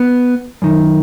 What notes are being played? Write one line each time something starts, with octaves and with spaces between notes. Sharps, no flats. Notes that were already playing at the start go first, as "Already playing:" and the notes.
Already playing: B3
F#2 D#3